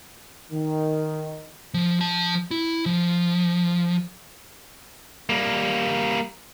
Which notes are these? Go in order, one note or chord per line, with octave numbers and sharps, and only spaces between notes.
D#3
F3
F3 A5
E4
F3
G3 A#3